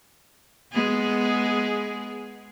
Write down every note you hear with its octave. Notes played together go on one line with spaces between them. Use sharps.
G#3 B3 G#4